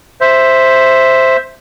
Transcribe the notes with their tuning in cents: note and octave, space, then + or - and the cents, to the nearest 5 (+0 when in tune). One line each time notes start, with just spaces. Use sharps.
C5 +0 E5 +0